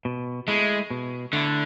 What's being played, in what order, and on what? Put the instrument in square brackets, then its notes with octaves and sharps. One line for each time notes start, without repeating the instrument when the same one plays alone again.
[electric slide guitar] B2
[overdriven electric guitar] G#3 [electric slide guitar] A3 E4
[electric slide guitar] B2
[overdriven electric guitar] D3 [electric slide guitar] A3 E4